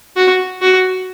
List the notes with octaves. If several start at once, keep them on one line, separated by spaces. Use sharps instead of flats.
F#4
F#4